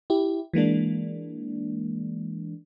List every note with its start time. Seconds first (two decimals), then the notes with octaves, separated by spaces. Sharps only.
0.10 E4 G4
0.54 E3 G#3 A#3 D4